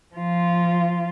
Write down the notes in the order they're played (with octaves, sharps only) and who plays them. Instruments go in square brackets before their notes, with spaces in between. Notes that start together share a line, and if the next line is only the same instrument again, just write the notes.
[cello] F3 F4